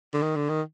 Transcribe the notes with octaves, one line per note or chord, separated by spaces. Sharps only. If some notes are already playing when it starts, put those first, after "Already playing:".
D3
D#3
D3
D#3